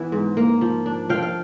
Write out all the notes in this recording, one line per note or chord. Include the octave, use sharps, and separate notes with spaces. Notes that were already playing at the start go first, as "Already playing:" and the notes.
Already playing: E3 B3 E5 F#5
G#2
A#3
F3
D4
F3 F5 G5
F5